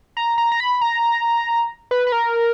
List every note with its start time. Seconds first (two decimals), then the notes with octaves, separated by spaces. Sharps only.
0.17 A#5
0.38 A#5
0.52 A#5
0.60 B5
0.81 A#5
1.91 B4
2.07 B4
2.12 A#4